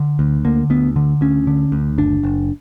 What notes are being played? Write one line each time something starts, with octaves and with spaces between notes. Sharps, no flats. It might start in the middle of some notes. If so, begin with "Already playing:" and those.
Already playing: D3
D2
D3 A#3
D2 B3
D3
D2 C#4
D3
D2
F#1 D4
F#1